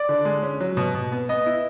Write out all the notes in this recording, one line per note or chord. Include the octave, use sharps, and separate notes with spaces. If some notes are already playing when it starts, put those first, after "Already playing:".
Already playing: D5
D3
G#3
C#4
F#3
B2
B2
B3
B3 D#5
E4